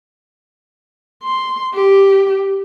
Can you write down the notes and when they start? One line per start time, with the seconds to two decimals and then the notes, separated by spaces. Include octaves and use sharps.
1.23 C6
1.74 G4